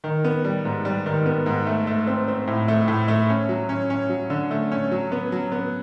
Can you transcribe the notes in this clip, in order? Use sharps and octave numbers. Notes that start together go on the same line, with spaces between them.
D#3
B3
G3
G#2
G3
D#3
B3
G#2
A3
A3
C4
C4
A2
A3
A2
A3
C#4
F#3
C#4
C#4
F#3
D3
A3
C#4
F#3
B3
F#3
B3